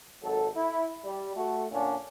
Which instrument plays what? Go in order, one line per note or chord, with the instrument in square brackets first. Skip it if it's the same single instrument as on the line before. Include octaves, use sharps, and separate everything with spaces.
[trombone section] G#1 F#3 A4
E4
G3
A3 F#4
A#2 D3 C#4 D4